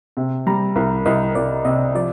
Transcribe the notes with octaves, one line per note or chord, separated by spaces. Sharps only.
C3
G3 A#5
C2
C2 D#5
C2 D5
C3 D#5
F3 D5